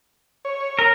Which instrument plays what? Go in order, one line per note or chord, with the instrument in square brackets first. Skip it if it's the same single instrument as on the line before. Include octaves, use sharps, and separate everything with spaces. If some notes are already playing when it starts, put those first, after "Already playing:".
[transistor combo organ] C#5
[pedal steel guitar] A#4